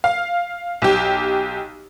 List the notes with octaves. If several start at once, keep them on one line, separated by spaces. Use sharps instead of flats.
F5
B1 G4